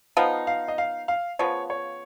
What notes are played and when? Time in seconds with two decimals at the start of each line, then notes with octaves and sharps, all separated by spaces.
0.17 F3 B3 D#4 F5
0.47 F5
0.68 D#5
0.78 F5
1.08 F5
1.39 C#3 F3 B3 C#5
1.70 C#5